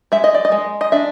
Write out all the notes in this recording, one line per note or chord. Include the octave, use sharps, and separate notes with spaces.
G#3 E5
D#5
D5
D#5
G#3
D#5
D4 E5